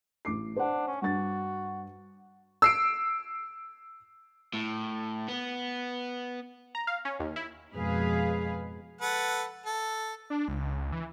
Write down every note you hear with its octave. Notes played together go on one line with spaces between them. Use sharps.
A1 D6 C7
D4 C5 F#5
C#4
G2 F#4 A6
E6 C7 D7
A2
B3
A#5
F5
C#4
D#2
E4
F2 G#2 B2 G#4 B4 F5
A4 B4 F#5
A4
D4
C#2
C#2
E3